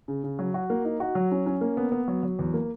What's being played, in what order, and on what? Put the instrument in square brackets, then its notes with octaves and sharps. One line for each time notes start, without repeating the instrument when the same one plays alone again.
[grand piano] C#3
C#3
F#3
F#4
A#3
D#4
F#4
F#3
C#4
C#4
A#3
B3
B3
F#3
F#3
E2
A#3